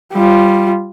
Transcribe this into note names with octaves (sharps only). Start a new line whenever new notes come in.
G3 F4